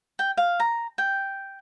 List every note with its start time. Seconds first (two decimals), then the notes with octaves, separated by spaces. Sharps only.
0.19 G5
0.37 F5
0.60 A#5
0.98 G5